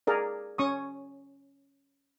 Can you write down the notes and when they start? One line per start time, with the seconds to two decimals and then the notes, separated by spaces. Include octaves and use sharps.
0.07 G#4 A#4 D5
0.58 C#4 C#6 D#6